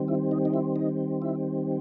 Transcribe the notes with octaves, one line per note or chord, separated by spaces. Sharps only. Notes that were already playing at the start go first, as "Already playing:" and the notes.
Already playing: D#3 G3 C4
E4
D#4
D#4
E4
D#4
E4